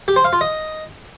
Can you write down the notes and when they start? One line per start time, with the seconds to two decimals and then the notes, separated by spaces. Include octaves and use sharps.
0.08 G4
0.16 C5
0.25 F5
0.33 F4
0.41 D#5